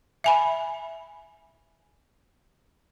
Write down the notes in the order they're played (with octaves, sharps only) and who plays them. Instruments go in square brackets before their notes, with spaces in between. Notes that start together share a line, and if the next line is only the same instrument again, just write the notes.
[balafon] E5 G#5 B5